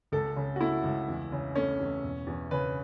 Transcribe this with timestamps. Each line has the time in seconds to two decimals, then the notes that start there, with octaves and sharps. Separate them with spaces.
0.12 C#2 A4
0.36 C#3
0.56 F#4
0.61 A3 E4
0.84 C#2
1.09 E2
1.32 C#3
1.55 A3 C#4
1.80 E2
2.03 E1
2.27 E2
2.51 C#3 B4